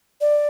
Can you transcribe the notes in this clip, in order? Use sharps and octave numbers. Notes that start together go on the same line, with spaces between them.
D5